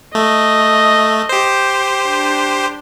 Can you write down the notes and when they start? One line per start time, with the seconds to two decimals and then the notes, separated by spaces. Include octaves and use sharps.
0.15 A3 D#5
1.29 G4 C5
2.05 D4